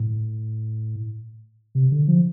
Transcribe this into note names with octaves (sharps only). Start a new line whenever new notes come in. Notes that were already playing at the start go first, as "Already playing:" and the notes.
Already playing: A2
C3
D3
F3